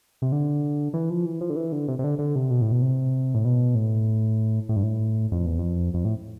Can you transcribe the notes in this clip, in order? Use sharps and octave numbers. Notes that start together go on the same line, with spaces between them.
C3
D3
E3
F3
E3
F3
D3
E3
D3
C3
C3
D3
D3
C3
B2
A2
B2
C3
A2
B2
A2
A2
G2
A2
F2
E2
F2
F2
A2